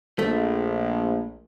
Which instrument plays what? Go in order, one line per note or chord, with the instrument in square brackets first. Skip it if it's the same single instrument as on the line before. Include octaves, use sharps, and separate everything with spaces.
[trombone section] A#1 [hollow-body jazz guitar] A3